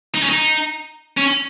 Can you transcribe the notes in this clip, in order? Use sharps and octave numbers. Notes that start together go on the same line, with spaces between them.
D#4
C#4
D#4
C#4